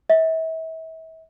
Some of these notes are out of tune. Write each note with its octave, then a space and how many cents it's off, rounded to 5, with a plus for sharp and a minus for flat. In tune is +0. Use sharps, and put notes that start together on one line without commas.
E5 -35